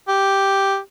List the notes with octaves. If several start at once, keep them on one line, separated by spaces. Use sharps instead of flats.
G4